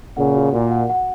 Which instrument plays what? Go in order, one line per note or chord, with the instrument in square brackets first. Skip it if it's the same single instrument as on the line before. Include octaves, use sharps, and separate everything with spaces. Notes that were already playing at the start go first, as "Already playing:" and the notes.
[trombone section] A#2 C#3 [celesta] F#5
[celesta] F#4
[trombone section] A#2 [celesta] F#4
[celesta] F#5
F#5